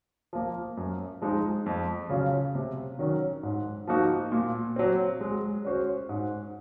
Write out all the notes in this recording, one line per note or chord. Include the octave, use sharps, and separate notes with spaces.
F3 A#3
F#2
F3 G#3 D#4
F2
C#3 F#3 C#4 F4
C3
D#3 F#3 C#4
G#2
F3 A#3 D#4 F#4
A#2
F#3 C4
G#3
C#4 F#4 C5
G#2